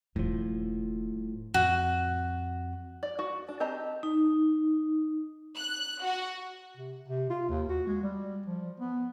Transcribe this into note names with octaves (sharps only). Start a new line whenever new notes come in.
D#1 A2 F3 D4
F2 A2 F#4
D5
F#4
D4
C4 G4 D#5 A5 A#5
D#4
F#6
F#4
C3
C3
F4
D#2
F#4
G#3
G3
F3
B3